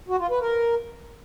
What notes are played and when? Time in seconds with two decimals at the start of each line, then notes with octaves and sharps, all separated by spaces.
0.09 F#4
0.19 F4
0.30 B4
0.41 A#4